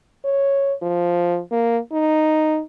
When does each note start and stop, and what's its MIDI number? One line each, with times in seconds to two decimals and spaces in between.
0.25 0.73 73
0.82 1.40 53
1.52 1.78 58
1.92 2.61 63